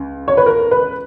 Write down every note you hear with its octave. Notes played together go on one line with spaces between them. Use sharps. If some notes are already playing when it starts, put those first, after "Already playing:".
Already playing: C#2
C#5
B4
A#4
B4